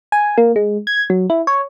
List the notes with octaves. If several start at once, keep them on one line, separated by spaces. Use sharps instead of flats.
G#5
A#3
G#3
G#6
F#3
E4
C#5